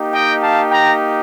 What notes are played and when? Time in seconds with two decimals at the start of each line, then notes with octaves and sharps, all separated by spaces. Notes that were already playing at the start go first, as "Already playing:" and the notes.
Already playing: A#3 D#4 G4
0.13 D#5 G5
0.42 F5 A5
0.71 G5 A#5